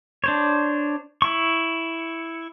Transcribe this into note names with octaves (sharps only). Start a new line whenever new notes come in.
D4 C5 C#5
E4 C#6